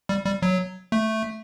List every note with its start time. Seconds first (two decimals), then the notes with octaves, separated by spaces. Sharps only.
0.09 G3
0.26 G3
0.42 F#3
0.92 A3